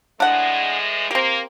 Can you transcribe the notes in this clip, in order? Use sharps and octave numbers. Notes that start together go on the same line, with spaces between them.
A2 E3 G#3 D4 F#5
A#3 C4 G4